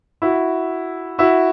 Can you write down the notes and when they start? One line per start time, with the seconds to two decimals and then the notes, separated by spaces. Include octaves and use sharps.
0.22 E4 F#4
1.18 E4 F#4